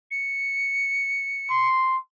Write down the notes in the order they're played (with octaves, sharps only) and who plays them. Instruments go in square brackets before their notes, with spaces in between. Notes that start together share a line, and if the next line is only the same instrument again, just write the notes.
[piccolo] C#7
[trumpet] C6